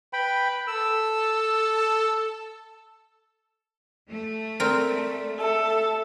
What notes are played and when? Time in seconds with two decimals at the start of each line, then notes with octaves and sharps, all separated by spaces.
0.13 B4 G5 B5
0.68 A4 E6
4.10 A3
4.60 C4 A#4 D5
5.40 A4 E5